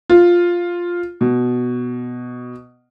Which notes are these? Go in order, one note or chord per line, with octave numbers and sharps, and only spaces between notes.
F4
B2